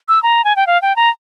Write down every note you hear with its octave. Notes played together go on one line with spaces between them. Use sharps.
E6
A#5
G#5
G5
F5
G5
A#5